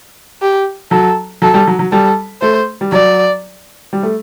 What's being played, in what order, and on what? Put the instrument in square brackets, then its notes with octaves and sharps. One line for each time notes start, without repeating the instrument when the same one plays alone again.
[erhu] G4
[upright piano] F#3 [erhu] A4
[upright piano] F#3 [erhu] A4
[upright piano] G3
F#3
F#3
[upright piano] G3 [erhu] A4
[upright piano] A3 [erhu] C5
[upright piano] G3
[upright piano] F#3 [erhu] D5
[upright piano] G3
A3